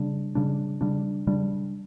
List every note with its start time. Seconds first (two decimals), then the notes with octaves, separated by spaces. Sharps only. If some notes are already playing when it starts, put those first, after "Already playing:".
Already playing: C#3 G3 D4
0.35 C#3 G3 D4
0.81 C#3 G3 D4
1.27 C#3 G3 D4